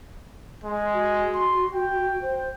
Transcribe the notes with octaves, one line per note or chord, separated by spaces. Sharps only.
G#3
F#4
C6
G5
C5 G5